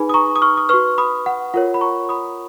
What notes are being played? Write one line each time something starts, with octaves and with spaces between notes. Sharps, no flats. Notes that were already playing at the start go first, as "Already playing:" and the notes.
Already playing: D#4 G#4 B4 G#5 B5
D#6
A#5 C#6
D#6
C#6 F6
D#6
F#4 B4 C#6 F6
B5 D#6
F#5
F4 A#4 C#5 F#5
B5
A#5 C#6
B5 D#6